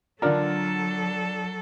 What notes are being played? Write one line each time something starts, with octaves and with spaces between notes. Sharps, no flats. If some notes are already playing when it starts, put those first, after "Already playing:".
D3 F#3 D4 F4 A4 A#4 D5